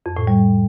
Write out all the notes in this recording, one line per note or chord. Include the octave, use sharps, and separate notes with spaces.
F2
A2
G3